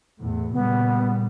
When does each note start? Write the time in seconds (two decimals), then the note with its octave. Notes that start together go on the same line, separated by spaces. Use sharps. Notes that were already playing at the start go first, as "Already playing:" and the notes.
0.20 E2 A2
0.53 A#2 C#3 G3 B3